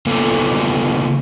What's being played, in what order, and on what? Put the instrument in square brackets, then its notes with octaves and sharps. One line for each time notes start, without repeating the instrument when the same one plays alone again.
[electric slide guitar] C#3 A#3 B3 A4